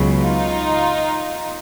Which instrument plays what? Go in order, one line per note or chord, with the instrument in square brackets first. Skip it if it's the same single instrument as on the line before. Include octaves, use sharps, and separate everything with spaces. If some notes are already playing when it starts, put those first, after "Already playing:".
Already playing: [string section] C#2 B2 F#3
D#4 F4